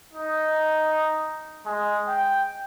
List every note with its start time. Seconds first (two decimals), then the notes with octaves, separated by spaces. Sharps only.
0.13 D#4
1.65 G#3
2.08 G5